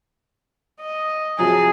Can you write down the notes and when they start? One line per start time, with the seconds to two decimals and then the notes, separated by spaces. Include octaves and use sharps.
0.81 D#5
1.39 C3 F3 F#3 G#4